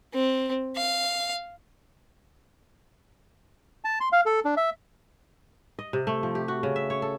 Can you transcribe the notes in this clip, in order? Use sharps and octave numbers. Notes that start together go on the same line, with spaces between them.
C4
F5
A5
C6
F5
A4
D4
E5
D#5
C3
A3
F3
G4
F#4
C#3
E5
C#5
A4